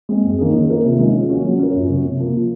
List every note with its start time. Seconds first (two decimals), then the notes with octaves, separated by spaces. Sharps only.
0.09 G#3 C4
0.24 F#2
0.38 D#3 A#3 C#4 G#4
0.53 D#3
0.69 A#3 F4 A#4
0.84 C3
0.99 D#3 G#3 C#4 F4
1.14 F3
1.29 A#3 C#4 F#4
1.44 F#3
1.59 C#4 F4 A#4
1.73 F#2
1.88 C#3 F#3 C#4
2.04 C3
2.19 F3 A#3